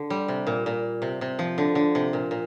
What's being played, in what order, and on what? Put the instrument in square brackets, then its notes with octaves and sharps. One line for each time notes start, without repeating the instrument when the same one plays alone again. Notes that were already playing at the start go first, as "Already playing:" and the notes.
Already playing: [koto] D3
G3
C3
A#2
A#2
C3
C3
F3
D3
D3
C3
A#2
A#2